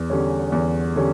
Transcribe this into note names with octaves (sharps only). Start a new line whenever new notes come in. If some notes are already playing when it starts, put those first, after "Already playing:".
Already playing: E2
D3 G3 C#4
E2
D3 G3 C#4